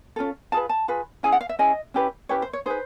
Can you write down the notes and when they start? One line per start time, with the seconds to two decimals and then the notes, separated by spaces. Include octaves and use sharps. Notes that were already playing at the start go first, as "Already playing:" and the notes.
0.16 C#4 F4 A4
0.52 F4 G#4 B4 A5
0.69 A5
0.88 F4 G#4 B4
1.23 C#4 E4 G#4 G#5
1.32 F#5
1.41 F5
1.49 E5
1.59 C#4 E4 G#4 D#5
1.94 C#4 E4 G4 B4
2.29 C#4 E4 G4 B4 C#5
2.42 C5
2.53 C#5
2.66 D#4 G#4 B4 C5